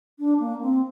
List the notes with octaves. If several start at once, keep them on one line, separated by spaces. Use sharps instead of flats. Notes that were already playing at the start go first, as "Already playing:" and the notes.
D4
A#3
C4